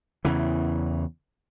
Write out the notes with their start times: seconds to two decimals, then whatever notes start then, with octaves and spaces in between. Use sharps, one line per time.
0.25 E2 C#3 E3